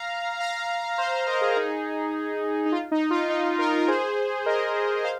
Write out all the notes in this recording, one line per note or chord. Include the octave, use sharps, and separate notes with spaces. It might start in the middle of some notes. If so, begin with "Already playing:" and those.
Already playing: F5 A#5
F5 A#5
C5 F5
C5 F5
A#4 D#5
G#4 C5
D#4 G#4
D#4
F4
D#4
F4
D#4
F4 A#4
A#4
G#4 C5
A#4 D#5
C5 F5